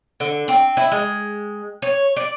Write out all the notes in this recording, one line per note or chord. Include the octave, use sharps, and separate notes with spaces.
D3
C4
E4
G#3
C#5
D5